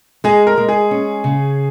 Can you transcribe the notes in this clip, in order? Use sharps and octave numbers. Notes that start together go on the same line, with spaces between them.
G#3 G#4
A#4
G#3
G#4
C#4
C#3